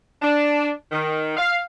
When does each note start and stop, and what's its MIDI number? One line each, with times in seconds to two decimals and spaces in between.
0.22 0.70 62
0.92 1.33 51
1.37 1.58 77